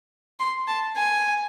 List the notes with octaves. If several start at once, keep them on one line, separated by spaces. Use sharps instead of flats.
C6
A5
G#5